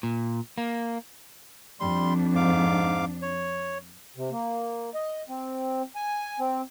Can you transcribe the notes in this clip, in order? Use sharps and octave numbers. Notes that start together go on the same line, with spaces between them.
A#2
A#3
F2 G3 D4 C6
G#2 F5 D6
C#5
C3
A#3
D#5
C4
G#5
C4